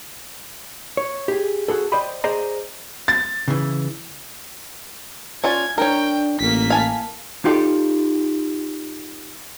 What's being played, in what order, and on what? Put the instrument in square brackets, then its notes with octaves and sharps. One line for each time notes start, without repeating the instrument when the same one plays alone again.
[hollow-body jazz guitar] C#5
G4 G#4
F#4 G#4 A4
C5 D5 D#5 G5 B5
G#4 C5 D5 D#5 A#5
[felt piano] A6
[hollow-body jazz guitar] C#3 E3
[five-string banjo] C#4 F4 D5 [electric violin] G#6
[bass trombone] D4 [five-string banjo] A#4 C#5 [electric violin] G5
[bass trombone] A1 [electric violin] A#3 B6
[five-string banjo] F5 G#5 A5
[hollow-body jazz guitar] D#4 F4 G4 A4 D5